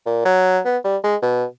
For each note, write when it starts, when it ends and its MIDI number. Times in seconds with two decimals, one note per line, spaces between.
0.06 0.25 46
0.25 0.60 54
0.65 0.77 59
0.84 0.97 55
1.04 1.16 56
1.22 1.45 47